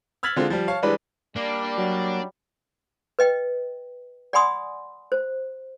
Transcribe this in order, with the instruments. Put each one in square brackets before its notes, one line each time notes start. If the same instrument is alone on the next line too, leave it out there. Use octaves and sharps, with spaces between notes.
[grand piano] E6 F6 G#6 A6 B6 F#7
D3 G#3 C4 F4
F3 G3
C#5 F5 A5
E3 G3 G#3 D4 B4 D5
[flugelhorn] G3 [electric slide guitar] A#3 [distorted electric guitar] D4
[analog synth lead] F#3
[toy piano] B4 D#5 G5
D5 F#5 G#5 B5 C6 D#6
C5